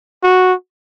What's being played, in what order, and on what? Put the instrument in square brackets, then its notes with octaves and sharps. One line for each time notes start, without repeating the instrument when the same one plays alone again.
[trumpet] F#4